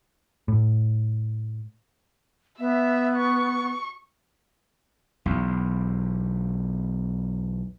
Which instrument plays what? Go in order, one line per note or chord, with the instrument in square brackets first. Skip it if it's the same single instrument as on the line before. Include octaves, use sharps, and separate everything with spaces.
[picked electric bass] A2
[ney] B3 [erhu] E5
[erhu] C#6
[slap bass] B1 E2